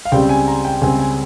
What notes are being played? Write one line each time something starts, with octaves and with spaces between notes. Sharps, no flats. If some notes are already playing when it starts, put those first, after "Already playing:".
F5
C#2 C#3 G3 C4 G5
G#5
A#5
G5
C#2 C#3 G3 C4 G#5
G#5